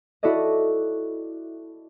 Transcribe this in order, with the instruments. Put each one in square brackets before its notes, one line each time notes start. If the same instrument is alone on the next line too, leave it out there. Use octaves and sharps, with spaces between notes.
[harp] E4 F#4 A4 D5 D#5